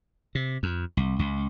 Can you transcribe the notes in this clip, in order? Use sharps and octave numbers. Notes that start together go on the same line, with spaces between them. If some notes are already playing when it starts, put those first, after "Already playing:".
C3
F2
C2
C#2